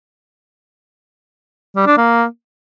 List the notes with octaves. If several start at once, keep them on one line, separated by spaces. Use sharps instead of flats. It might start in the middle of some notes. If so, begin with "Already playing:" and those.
G3
D4
A#3